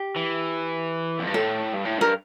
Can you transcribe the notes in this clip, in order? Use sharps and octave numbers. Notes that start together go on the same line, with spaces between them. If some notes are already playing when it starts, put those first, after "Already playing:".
Already playing: G4
E3
F2
G2
A2 A4
G2
A2
G2 A#4